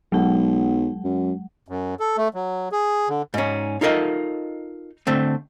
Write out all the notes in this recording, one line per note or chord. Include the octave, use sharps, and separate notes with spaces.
B1 F#3 G#3 F#5
F#2
F#2
A4
A3
F#3
G#4
D3
G#2 C#4
D#4 F4 A4 A#4 D#5
D3 A3 C4